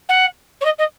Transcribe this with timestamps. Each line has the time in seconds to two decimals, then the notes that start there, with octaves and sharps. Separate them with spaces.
0.09 F#5
0.61 C#5
0.65 D#5
0.78 D#5